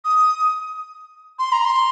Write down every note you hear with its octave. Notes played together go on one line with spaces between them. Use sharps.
D#6
C6
A#5
C6